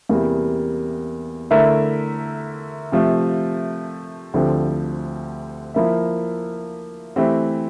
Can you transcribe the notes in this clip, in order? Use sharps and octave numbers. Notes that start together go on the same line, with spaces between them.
E2 C3 G3 A#3
D3 A3 E4 A#4 E5
C3 F3 A3
D2 D3 F3 C4 G4
F3 A#3 E4 A#4 E5
E3 A3 C4 G4